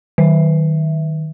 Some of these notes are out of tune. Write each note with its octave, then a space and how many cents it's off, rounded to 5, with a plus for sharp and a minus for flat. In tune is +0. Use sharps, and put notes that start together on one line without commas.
D#3 +0 E5 +0